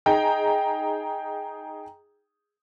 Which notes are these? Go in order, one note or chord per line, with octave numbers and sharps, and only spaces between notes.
D#4 G#4 G5 A#5